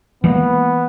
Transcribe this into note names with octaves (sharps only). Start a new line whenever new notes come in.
E3 G#3 A#3 B3